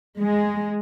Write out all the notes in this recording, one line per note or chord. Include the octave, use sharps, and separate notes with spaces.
G#3